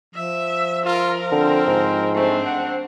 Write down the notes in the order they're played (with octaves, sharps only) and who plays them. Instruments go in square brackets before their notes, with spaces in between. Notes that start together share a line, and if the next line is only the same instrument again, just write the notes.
[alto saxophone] F3 [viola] E5
[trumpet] F4 [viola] A#4
[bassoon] D3 [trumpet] C4
[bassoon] G#2
[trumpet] A3 [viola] C4 D4
[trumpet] F#5